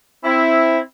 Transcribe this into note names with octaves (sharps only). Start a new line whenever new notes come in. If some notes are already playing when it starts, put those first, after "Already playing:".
C4 E4